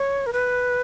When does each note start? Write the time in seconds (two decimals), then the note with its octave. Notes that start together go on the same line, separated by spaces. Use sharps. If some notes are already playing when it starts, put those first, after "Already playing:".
Already playing: C#5
0.26 A#4
0.33 B4